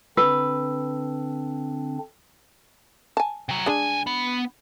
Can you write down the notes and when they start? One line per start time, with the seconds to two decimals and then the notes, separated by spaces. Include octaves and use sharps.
0.17 D3 C4 D4 B4 E6
3.17 G#5 A5
3.49 C3 F#3
3.66 C2 G#3 D4 G#5
4.07 B3